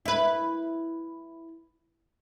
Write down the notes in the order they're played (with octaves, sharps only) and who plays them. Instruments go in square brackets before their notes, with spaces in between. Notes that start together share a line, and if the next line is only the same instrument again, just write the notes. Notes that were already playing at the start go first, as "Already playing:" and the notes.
[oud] E4 B4